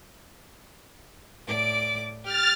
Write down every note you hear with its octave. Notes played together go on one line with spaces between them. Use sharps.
A2 D5 D6
G4 F6 A6